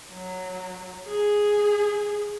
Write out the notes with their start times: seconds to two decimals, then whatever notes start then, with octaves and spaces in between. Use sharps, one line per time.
0.13 F#3
1.08 G#4